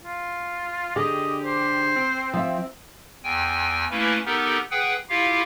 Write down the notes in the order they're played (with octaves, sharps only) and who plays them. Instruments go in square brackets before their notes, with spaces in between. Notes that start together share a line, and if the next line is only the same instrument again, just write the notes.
[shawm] F4
[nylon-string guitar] D3 G#4 [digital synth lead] G4 [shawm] D#5
[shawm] C5
[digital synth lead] C4
[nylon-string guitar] F3 E5
[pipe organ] E2 G5 G#5
A3 A#3 C#4 E4 B4
B3 D#4 G4 A4 A#4
G#4 B4 F#5 G5
E4 F4 G4 F5